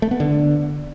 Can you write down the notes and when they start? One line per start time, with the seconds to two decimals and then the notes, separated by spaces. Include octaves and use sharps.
0.02 A3
0.11 B3
0.20 D3